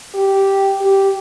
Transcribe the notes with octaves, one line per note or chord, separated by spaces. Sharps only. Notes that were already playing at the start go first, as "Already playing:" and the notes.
G4
G4